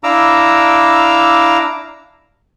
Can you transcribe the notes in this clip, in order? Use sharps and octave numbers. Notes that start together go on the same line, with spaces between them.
D4 E4 F5 A#5 D6 E6